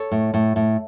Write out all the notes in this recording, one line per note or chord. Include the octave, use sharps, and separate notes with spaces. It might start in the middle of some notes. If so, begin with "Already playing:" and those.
Already playing: A4 C#5
A2
A2
A2